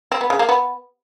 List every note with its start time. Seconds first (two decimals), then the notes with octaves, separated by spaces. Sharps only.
0.12 C4
0.21 B3
0.30 C#3
0.39 A#3
0.49 B3